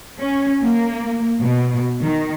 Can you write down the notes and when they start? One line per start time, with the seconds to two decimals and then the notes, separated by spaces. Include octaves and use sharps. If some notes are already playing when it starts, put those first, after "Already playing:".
0.20 C#4
0.63 A#3
1.41 B2
2.02 D#3